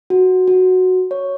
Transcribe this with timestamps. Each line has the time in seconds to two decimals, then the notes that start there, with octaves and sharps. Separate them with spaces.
0.10 F#4
0.48 F#4
1.11 C#5